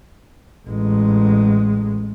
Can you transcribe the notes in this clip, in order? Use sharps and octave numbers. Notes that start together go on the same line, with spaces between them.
A1 G#3